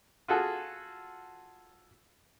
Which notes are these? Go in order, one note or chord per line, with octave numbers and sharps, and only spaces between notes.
F4 F#4 G#4 A4